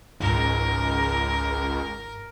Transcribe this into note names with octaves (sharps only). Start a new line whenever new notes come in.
G#1 C#2 A#4